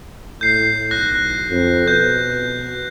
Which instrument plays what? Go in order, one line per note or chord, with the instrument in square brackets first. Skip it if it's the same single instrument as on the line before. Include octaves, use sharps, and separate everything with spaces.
[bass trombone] A2 [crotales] G6 C7
[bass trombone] B1 [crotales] F#6 A#6
[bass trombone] F2
[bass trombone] B2 [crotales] G6